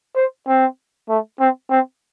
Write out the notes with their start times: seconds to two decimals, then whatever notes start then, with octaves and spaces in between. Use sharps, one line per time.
0.16 C5
0.48 C4
1.09 A3
1.40 C4
1.71 C4